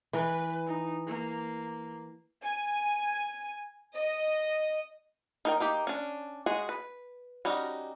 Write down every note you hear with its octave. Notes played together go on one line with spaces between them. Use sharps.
E3 B4
D#4
A#3
G#5
D#5
D#4 A#4 G5
A#3 D#4 G4
C#4 D4
G#3 F#4 G#4
B4
G3 C#4 D#4 F#4